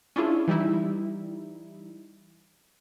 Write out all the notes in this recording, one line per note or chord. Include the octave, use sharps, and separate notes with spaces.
C#4 D4 E4 F4 G#4
E3 G3 D#4 E4